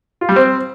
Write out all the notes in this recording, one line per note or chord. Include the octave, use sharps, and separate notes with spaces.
F4
G3
C4